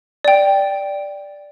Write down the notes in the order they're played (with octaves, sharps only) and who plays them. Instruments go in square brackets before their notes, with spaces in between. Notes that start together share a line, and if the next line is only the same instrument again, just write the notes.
[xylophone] D5 G5